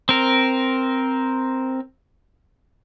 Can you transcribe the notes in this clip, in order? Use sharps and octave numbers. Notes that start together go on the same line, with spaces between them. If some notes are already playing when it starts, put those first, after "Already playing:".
C4 A#4